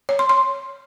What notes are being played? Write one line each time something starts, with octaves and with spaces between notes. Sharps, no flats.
C#5
C6
C6